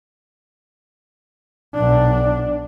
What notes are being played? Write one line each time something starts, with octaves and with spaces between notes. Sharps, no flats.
B1 D4